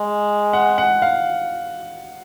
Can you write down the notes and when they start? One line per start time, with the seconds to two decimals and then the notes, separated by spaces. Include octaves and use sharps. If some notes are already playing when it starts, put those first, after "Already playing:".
Already playing: G#3
0.53 F#5
0.78 F#5
1.02 F5